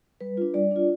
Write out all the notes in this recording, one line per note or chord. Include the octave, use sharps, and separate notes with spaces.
G3 B4
D4 F4
G3 D5
D4 F4